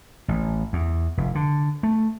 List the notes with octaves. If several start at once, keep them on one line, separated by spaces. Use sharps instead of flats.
A1
E2
F1
D3
A3